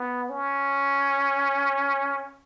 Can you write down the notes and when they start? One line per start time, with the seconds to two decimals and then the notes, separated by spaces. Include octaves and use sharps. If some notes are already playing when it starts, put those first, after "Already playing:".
Already playing: B3
0.30 C#4